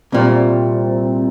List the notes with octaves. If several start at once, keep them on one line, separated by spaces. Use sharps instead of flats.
C2 A#2 G3 C4